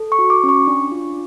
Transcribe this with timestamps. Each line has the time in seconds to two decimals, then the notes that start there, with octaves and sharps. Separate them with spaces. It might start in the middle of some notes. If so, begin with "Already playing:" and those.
Already playing: A4
0.12 C#6
0.19 F#4
0.30 D6
0.44 C#4
0.49 C#6
0.67 D4
0.92 F4